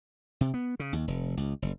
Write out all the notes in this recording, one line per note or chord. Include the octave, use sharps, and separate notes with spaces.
C3
B3
C#3
D#2
F1
C#2
F#1